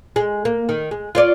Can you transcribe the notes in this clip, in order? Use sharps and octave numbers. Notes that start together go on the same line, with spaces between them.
G#3
A#3
D#3
G#3
F4 C#5 D5